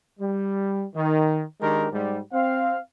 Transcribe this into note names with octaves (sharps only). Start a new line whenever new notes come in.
G3
D#3
D#3 G#3 D4 G4 A#4
G#2 G3
C4 F5